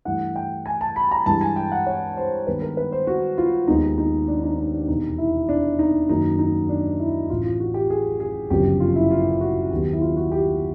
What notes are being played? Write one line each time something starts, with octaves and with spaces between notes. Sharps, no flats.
G2 E3 A3 F#5
G5
G#5
A5
B5
A#5
G2 E3 G#3 A5
G#5
G5
F#5
C#5
C5
G2 D#3 G#3 B3 B4
A#4
B4
C5
F#4
F4
D#2 D#3 G#3 B3 D#4
D#4
D4
D#4
D#4
D4
F1 E2 B2 D#4
E4
D4
D#4
F#2 D#3 F#3 A#3 D#4
D#4
D4
E4
A1 A2 E3 F4
F4
F#4
G4
G#4
G#4
G1 F#2 C#3 F3 G4
F4
E4
F4
F#4
D#2 D#3 F#3 B3 G4
E4
F4
F#4
G4